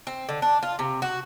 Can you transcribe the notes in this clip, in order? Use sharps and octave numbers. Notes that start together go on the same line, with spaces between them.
C4
D3
D4
F4
C3
F#4